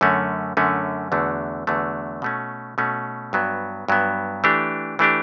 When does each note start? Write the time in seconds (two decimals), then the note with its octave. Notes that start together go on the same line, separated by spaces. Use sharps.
0.01 F#2 D3 A3 C#4
0.57 F#2 D3 A3 C#4
1.12 E2 D3 F#3 A3
1.67 E2 D3 F#3 A3
2.22 B2 A3 C#4
2.78 B2 A3 C#4
3.33 G2 F#3 B3
3.88 G2 F#3 B3
4.44 E3 A3 D4 G4
4.99 E3 A3 D4 G4